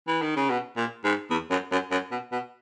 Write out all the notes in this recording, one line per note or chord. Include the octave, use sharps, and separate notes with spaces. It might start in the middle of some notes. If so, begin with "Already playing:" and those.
E3
D#3
C#3
B2
A#2
G#2
E2
F#2
F#2
F#2
B2
B2